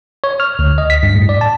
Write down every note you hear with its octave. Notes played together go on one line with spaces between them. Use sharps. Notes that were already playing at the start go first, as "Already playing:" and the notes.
C#5
F6
D2
D#5
B6
G2
A2
D5
A5